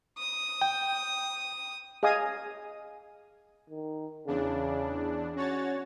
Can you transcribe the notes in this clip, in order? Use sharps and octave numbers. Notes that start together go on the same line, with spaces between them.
D#6
G5
G#4 D#5 F5 G#5 D#6
D#3
E2 C#3 D4
C#4 F#4 C#5 A6